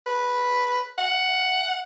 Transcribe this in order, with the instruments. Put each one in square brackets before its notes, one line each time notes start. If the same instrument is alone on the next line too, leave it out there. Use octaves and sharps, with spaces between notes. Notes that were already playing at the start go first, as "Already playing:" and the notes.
[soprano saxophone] B4
F#5